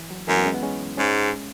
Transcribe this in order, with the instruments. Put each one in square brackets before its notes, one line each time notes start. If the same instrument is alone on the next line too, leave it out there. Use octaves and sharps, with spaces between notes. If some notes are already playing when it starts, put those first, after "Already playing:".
Already playing: [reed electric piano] E3
F#3
[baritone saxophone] F#2 [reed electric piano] E3 G#3
[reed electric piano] F#3 B3
G#3 C#4
B3 E4
G#3 C#4
[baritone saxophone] G#2 [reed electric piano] G#3 C#4